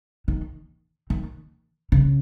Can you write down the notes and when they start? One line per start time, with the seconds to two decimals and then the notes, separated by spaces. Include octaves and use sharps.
0.28 D#3
1.10 D#3
1.92 C#3